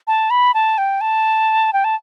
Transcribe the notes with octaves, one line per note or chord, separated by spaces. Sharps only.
A5
B5
A5
G5
A5
G5
A5